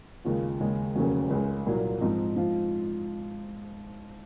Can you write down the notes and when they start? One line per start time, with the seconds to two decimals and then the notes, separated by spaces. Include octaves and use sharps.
0.25 D#2 C#3 G#3 C#4 F4
0.60 D#2 C#3 G#3 C#4
0.96 F1 D#2 C#3 F#3 C#4
1.30 C#2 C#3 G#3 C#4
1.67 C2 A#2 F#3 A#3
2.01 G#2 F3 C4 D#4
2.36 G#2 F3 C4 F4